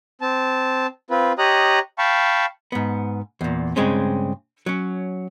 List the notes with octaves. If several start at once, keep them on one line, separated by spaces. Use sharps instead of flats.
C4 A5
C4 F4 B4
G4 C#5 D#5 A#5 D#6 F#6
F5 G5 A5 B5 C#6
G#2 B3
E2 A#2
G2 C#3 G#3 C4 C#4
F#3 C#4